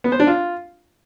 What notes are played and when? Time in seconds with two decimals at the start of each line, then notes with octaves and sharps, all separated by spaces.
0.04 B3
0.12 C5
0.20 D4
0.27 F4